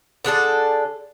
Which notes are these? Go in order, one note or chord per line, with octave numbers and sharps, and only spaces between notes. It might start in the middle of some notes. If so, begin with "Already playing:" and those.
D3 D4 G#4 A4